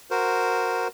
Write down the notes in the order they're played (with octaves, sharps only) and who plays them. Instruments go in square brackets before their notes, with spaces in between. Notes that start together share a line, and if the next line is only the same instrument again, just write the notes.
[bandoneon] F#4 A#4 C5